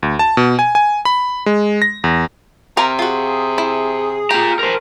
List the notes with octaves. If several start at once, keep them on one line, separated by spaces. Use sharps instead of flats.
D2
A5
B2
G#5
G#5
B5
G#3
A#6
E2
C3 A#4 F5 A#5
F4 F#4 G#4
E4
F4 G4 A#5
A#4 C5